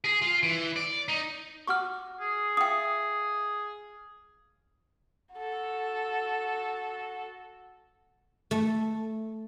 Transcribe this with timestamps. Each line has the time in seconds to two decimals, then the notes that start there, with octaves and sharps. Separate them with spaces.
0.04 G#4
0.22 F4
0.43 E3
0.76 D5
1.08 D#4
1.67 F#4 C#6 D6 F6
2.21 G#4
2.57 F4 E5 G5 D#6
5.35 F#4 A4
8.51 A3